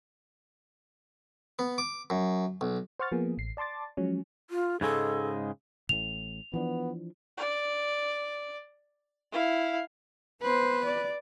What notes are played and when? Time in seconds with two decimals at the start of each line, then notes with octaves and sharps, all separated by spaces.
1.59 B3
1.78 D6
2.10 F#2
2.61 B1
2.99 C5 F#5 C#6 F6 A6
3.12 F3 A#3 B3 G#4
3.38 A1 C7
3.57 D5 A5 C6 D6 A6
3.97 F3 F#3 G#3 C#4
4.50 F4
4.81 G#2 C#3 G#3 A4
5.89 A1 A2 F7
6.53 E3 F3 B3 D4
7.37 D5
9.32 E4 F5
10.42 B3 B4 C5
10.85 D5